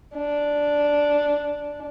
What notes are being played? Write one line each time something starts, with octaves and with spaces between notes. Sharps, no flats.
D4